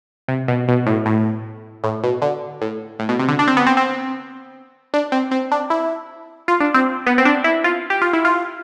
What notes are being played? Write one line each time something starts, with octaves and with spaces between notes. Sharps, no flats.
C3
B2
B2
A2
A2
A2
B2
D3
A2
A2
B2
C3
D3
D4
C4
B3
C4
C4
D4
C4
C4
D4
E4
F4
D4
C4
B3
C4
D4
E4
F4
G4
F4
E4
F4